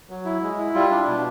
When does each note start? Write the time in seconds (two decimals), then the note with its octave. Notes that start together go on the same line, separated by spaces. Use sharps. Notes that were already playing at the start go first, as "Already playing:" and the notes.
0.10 F#3
0.25 E4
0.43 G#3
0.58 E4
0.75 G3 F4
0.91 D4
1.07 B2